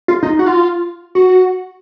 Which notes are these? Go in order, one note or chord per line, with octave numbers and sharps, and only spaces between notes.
F4
D#4
F#4
F4
F#4